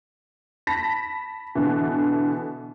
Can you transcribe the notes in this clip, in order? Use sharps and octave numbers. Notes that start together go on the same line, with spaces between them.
A5 B5 A#6 B6
B2 D3 E3